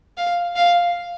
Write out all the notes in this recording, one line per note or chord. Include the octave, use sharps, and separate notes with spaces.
F5
F5